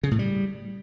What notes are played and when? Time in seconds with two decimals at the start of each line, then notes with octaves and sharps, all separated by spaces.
0.03 C#3
0.11 A2
0.19 G3